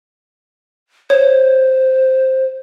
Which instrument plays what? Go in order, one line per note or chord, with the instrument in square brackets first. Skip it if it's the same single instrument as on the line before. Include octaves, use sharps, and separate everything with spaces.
[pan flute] C5 [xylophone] C#5